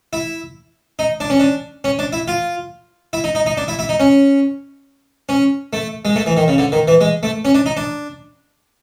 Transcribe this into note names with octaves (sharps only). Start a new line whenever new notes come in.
E4
D#4
D4
C#4
D4
C#4
D4
E4
F4
E4
D#4
D#4
D#4
D4
E4
E4
D#4
C#4
C#4
A3
G#3
A3
E3
D#3
C#3
D3
D#3
E3
G#3
A3
C#4
D4
D#4
D4